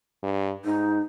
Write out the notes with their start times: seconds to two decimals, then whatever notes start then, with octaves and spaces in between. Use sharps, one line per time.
0.23 G2
0.65 G#2 D#4